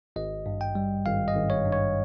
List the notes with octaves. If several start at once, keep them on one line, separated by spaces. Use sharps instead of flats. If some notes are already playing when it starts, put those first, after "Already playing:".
G#1 D#5
G2
G5
G3
G#1 F5
D#5
G#1
C#5
G2
C#5